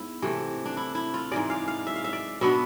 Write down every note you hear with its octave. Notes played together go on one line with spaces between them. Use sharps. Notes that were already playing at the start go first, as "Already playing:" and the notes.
Already playing: G#2 B3 E4
C3 E3 A3
D4
E4
E4
F4
G#2 E3 G#3 D5
F5
F5
E5
F5
E5
D5
B2 B3 D4 E5